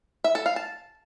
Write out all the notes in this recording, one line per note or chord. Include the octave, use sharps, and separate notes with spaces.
E5
A4
F5
A5